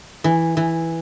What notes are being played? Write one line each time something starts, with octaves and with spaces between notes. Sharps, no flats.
E3
E3